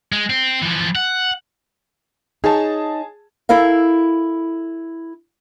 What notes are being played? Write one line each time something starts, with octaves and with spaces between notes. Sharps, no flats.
G#3
C4
E3 F3
F#5
D#4 G#4 C#5 A5
E4 A4 A#4 F5